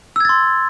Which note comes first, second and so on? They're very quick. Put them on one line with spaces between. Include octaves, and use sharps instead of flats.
E6 G#6 A6 C6